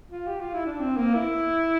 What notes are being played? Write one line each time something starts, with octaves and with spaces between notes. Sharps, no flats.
F4
G4
F4
E4
D4
C4
A#3
E4